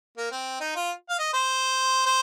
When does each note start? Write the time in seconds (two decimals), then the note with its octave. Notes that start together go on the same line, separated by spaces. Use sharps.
0.17 A#3
0.31 C4
0.60 D#4
0.75 F4
1.09 F5
1.19 D#5
1.34 C5
2.06 C5